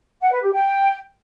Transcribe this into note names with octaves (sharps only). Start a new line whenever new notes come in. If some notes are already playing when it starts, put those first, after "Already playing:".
F#5
B4
G4
G5